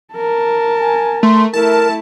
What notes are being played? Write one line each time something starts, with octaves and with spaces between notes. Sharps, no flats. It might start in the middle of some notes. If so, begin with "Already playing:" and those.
A#4 A5
G#5
A3 C6
A3 E4 A#4 A5